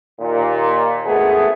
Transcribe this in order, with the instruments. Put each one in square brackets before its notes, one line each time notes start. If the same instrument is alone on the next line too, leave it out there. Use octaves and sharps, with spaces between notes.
[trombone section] D#2 A#2
G#1 A3 B3 G#4